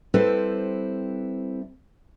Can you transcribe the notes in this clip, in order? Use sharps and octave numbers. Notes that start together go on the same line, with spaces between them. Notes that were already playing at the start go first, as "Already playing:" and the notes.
G3 C4 E4 A4 B4 C5